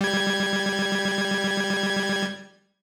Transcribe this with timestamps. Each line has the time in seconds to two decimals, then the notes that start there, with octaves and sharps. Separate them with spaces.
0.01 G3 G#6